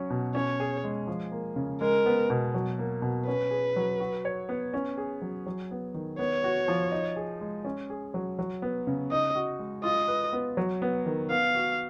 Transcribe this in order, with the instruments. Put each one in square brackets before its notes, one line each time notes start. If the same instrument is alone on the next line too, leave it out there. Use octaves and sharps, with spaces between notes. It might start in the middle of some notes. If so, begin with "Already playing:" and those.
Already playing: [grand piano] F#3 C#4
B2
[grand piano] C#4 [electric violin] C#5
[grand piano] G#4
G#3
F3
A#3
C#3
[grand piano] G#3 [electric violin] A#4
[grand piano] B3
B2
F#3
A#3
B2
[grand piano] C#4 [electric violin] B4
[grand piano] G#4
F#3
F#4
C#5
B3
C#4
G#4
F#3
F#3
B3
D#3
[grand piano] B3 [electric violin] C#5
[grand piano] F#4
F3
D#4
G#4
G#3
C#4
G#4
F#3
F#3
B3
C#3
[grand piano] D#4 [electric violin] D#5
[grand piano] F#4
G#3
[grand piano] F4 [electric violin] D#5
[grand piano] B4
B3
F#3
B3
D#3
[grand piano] B3 [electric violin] F5
[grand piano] F#4